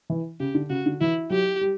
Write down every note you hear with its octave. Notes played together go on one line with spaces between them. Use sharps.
E3
C#3 G4
D3
C#3 F#4
D3
E3 E4
F#3 G4
G3